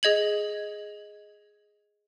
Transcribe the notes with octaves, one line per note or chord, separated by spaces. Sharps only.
G#4 D#5 G#6 F#7